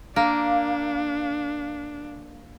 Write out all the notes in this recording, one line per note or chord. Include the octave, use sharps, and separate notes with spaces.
A#3 D4